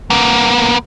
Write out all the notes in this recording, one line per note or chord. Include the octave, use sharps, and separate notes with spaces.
A#3 B3